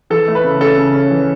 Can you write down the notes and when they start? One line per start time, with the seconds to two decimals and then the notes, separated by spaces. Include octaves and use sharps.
0.10 E3 A4
0.28 A3
0.35 B4
0.44 C#3
0.60 C#4 A4
0.77 C#3
0.94 C#4
1.10 E3